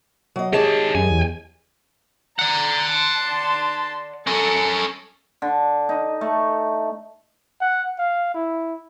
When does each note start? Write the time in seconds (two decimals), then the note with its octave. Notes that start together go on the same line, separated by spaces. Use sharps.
0.36 F#3 D#5
0.53 D#3 G4 G#4 C#5 D#5 A5
0.95 F#2 G#5
1.10 E2
2.39 D5 F#5 A#5
2.93 A5 C6
4.27 C#4 A4 A#4
5.42 D3
5.89 D#4
6.21 A3
7.61 F#5
7.99 F5
8.34 E4